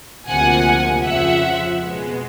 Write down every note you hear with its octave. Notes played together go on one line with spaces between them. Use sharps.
D2 C3 F3 A#3 F#5 G#5
F2 C#3 F3 E5 F#5
B2 G#3 B3